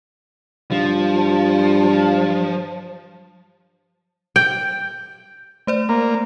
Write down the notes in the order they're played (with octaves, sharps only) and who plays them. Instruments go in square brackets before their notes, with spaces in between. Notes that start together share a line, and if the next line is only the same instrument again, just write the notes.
[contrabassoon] G2 [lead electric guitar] F3
[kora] G5
[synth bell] A3 C5 D5
[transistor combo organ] A#3